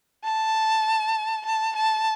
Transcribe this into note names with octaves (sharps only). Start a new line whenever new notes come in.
A5
A5
A5